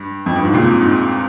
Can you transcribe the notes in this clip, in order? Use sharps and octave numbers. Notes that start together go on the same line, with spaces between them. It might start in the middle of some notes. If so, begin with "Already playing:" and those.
Already playing: G2
F2
G2
G#2
A#2
C3
G#2